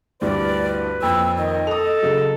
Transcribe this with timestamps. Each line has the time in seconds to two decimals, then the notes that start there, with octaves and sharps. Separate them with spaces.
0.21 D2 G2 E3 B4 D5
1.02 F2 A#2 E6
1.37 D#3 D#5
1.67 A4 D#6 F7
2.02 C#3 F#3